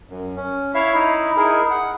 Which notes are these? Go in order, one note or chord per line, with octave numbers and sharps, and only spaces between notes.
F#2
C#4
E4 C#5 E5 F5
D#4 E4
D#4 E4 G#4 A#4
F#5